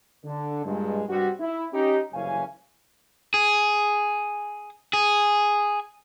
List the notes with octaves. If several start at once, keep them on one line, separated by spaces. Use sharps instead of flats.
D3
G2 A#2 G#3
G2 C3 G3 C4 F#4
E4
C#4 D#4 G4
F#1 C2 E3 C#4 F5 G#5
G#4
G#4